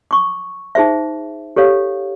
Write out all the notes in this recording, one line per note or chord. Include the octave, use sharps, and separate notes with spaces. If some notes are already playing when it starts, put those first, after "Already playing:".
C#6 D6
D#4 G#4 C5 E5
G4 A4 C#5 F5